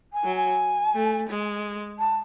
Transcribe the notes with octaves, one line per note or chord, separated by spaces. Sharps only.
G#5
F#3
G#5
A3
G#3
A5